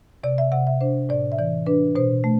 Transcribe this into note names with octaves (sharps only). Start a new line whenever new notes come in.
C3 D5
E5
C3 F#5
E5
D4 C5
A2 D5
E5
E3 D5
D4 B4
B2 C5
A3